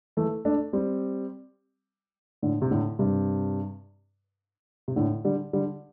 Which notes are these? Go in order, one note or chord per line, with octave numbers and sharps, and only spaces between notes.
E3 A3
A3 D4
G3 C4
A2 D3
C3
A2 D3
G2 C3
C3
A2 D3
D3 G3
D3 G3